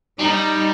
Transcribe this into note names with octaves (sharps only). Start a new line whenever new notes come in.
G3 D#4